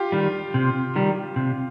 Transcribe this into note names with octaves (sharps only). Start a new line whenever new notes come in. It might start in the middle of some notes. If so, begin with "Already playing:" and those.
Already playing: F4 G4
D#3 G3
C3
D#3 G3
C3